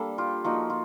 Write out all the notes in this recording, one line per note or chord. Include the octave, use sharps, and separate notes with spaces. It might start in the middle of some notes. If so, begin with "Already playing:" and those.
Already playing: G3 A#3 D4 A4
F4 G4
F3 A#3 D#4 F#4
F4